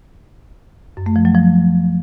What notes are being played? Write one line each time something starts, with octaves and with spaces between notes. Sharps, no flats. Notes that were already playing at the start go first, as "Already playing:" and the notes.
F#2
A3
F3
F#3
F3